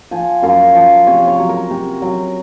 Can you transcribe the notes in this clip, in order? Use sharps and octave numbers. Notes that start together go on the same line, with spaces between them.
F3 G#5
F#2 F5
F3
C3 C#5
C#5
F#3
A#4
C3
F#3